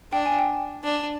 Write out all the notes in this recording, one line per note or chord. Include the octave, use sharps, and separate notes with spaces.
D4 G5
G#5
G5
D4